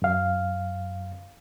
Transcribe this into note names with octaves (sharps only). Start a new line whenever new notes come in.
F#2 F5